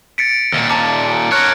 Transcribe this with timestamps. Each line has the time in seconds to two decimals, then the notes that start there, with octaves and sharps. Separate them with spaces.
0.18 A6 B6 C#7 D7
0.53 D#2 A#2
0.70 A5 A#5 D6
1.32 A#4 C#5 F6 F#6 G#6 C#7 D7